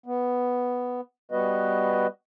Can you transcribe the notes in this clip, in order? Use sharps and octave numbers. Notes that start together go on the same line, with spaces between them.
B3
G3 B3 F#4 B4 D#5